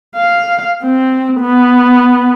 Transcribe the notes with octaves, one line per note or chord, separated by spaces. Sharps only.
F5
C4
B3